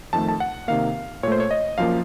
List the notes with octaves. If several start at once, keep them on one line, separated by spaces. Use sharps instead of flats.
F2 D#3 A3 A5
A5
F#5
C3 D#3 A#3 F5
A#2 A3 C5 C#5
C#5
D#5
F#2 F3 A#3 F5